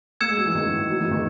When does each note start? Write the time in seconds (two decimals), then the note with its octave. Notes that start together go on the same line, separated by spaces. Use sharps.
0.21 A#3 E6 G#6 C#7 E7
0.29 G#3
0.37 F#3
0.46 E3
0.55 D#3
0.90 F#3
1.01 E3
1.11 D#3